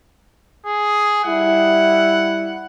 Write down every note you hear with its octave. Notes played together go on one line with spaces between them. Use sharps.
G#4
G3 E4 F#5